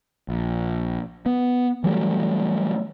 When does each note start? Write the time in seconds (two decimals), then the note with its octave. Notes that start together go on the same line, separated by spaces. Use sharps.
0.29 A#1
1.26 B3
1.84 E3 F#3 G3 A3